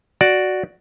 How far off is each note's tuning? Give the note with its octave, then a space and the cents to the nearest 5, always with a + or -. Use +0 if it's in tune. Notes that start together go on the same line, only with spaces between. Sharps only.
F#4 +0 D5 +0